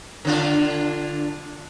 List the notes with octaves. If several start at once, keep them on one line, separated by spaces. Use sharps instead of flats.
D3 D4 F4